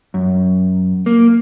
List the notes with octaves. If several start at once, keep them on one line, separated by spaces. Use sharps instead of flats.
F#2
A#3